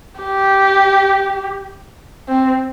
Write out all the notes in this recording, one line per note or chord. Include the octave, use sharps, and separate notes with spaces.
G4
C4